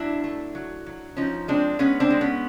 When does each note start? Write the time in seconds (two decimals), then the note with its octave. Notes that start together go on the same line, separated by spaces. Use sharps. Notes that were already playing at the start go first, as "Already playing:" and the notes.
Already playing: F#3 D4 E4
0.24 A3
0.55 F#3
0.86 F#3
1.17 F3 C#4 D#4
1.48 G#3 C4 D4
1.79 G#3 B3 C#4
2.00 C4 D4
2.10 G#3
2.21 B3 C#4